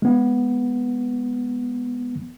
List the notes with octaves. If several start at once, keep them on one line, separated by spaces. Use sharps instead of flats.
G#3 B3